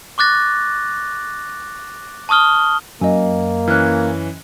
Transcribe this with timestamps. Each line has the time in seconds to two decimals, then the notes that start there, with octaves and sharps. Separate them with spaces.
0.18 C#6 D6 F#6 A6 A#6
2.29 A5 C#6 D#6 F6 G7
3.01 F#2 A#3 D#5 G#5
3.68 E3 C#4 F6 F#6